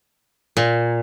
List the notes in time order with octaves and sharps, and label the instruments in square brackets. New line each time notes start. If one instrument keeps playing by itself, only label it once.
[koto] A#2